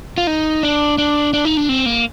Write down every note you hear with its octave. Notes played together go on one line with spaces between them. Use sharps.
F4
D#4
D4
D4
D4
D#4
D4
C4
A#3